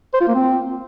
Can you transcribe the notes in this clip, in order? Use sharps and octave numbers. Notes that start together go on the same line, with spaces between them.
C5
F4
A#3
C4